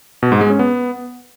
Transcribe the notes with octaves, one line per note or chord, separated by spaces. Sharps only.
B2
G#2
G#3
C#4
B3